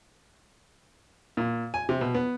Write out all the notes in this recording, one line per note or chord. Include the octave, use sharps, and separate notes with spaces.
A#2
G#5
C3
B2
B3